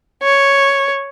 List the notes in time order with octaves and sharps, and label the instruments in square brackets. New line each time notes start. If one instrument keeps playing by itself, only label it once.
[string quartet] C#5